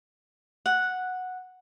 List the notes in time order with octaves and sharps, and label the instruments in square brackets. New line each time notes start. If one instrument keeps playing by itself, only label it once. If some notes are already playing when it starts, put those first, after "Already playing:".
[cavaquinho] F#5